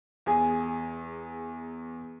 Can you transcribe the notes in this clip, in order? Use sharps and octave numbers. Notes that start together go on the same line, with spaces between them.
E2 G#4 G#5